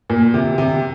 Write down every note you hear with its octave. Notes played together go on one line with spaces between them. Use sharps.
A#2
C3
C3